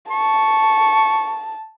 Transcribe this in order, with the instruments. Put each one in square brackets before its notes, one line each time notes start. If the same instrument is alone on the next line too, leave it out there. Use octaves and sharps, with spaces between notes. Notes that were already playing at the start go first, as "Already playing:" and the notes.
[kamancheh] A5 [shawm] C#6